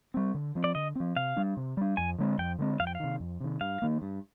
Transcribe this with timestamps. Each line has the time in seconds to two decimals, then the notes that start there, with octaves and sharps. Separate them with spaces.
0.14 G3 C4
0.34 D3
0.55 F3 C4
0.64 D5
0.75 D3 D#5
0.95 F3 C4
1.16 C3 F5
1.36 G3 D4
1.57 C3
1.77 G3 D4
1.97 F2 G#5
2.19 D3 G#3 C4
2.38 F2 G5
2.59 D3 G#3 C4
2.80 F2 F5
2.87 G5
2.95 F5
3.00 C3 D#3
3.20 F2
3.40 C3 D#3
3.61 G2 F5
3.82 D#3 A#3
4.02 G2